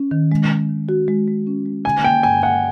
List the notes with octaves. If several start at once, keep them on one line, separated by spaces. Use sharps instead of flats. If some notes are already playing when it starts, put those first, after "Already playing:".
Already playing: C#4
D#3
G#3
C#4
D#3
F#4
G#3
G#3
C#4
G#3
D3 G#5
A#3 G5
G2 G#5
A#3 F#5